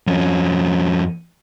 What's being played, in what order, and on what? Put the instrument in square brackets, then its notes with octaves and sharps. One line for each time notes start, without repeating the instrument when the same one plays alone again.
[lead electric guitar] F2 C#4